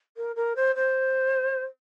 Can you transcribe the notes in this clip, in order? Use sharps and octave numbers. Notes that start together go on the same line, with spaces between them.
A#4
A#4
C5
C5